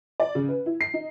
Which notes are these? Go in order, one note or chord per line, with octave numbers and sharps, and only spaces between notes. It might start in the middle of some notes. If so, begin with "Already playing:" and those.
D5
C#3
B4
E4
C7
D#4